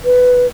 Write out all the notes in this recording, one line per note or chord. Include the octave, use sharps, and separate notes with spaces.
B4